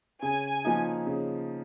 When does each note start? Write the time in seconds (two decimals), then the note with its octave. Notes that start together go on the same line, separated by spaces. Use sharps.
0.22 C#3 G#5
0.65 F3 A#3 D#4
1.07 C#3